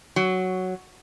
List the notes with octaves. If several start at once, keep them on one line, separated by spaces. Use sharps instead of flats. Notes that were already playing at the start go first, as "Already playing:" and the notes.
F#3